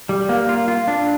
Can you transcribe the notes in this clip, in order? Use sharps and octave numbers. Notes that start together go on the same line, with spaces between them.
G3
A#3
F4
F4
D4